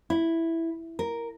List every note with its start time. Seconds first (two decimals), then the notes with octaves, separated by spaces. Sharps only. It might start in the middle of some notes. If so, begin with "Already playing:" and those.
0.10 E4
0.99 A#4